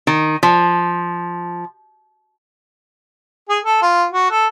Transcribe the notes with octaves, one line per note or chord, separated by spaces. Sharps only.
D#3
F3
G#4
A4
F4
F#4
A4